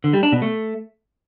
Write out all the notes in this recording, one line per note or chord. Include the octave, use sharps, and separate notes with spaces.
D3
G3
D4
B2
A3